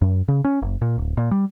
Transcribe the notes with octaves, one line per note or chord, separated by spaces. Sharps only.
F#2
C#3
C#4
F#1
A#2
D1
A#2
G3